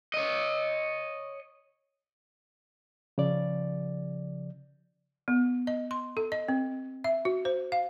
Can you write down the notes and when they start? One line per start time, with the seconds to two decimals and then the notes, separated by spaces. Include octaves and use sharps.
0.14 C#5 D#5
3.18 C#3 F3 D5
5.28 B3
5.67 D#5
5.91 C6
6.17 A4
6.32 D#5
6.48 C4
7.04 E5
7.25 F#4
7.45 C5
7.72 F5